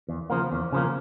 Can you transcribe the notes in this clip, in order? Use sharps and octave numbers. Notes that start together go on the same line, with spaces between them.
E2
C#3 F3 A#3
E2
C#3 F3 A#3